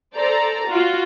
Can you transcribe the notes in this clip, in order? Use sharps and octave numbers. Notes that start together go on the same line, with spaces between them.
A4 C5 D5 A#5
F4 F#4